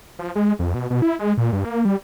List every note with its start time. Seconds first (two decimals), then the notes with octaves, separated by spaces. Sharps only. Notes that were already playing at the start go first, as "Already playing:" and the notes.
0.19 F3
0.35 G#3
0.59 F2
0.74 B2
0.90 B2
1.02 E4
1.19 G#3
1.37 A#2
1.53 G2
1.65 A#3
1.85 G3